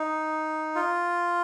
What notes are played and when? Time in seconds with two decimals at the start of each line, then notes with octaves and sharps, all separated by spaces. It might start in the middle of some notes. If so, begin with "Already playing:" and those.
Already playing: D#4
0.76 F4